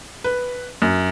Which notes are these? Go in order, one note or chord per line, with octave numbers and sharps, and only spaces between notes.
B4
F#2